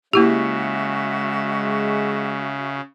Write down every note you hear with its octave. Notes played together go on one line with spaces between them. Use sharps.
C#3 G#3 A#3 E4 F#4 G4 E5